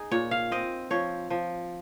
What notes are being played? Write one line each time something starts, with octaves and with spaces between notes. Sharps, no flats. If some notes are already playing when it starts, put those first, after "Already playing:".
Already playing: D#4 G#4
A#2 C#5
F5
C4 D#5
F3 C#5
F3